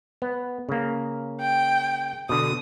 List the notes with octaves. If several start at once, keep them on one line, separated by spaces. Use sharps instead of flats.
B3
C#3 A#3
G5
B2 D3 D#6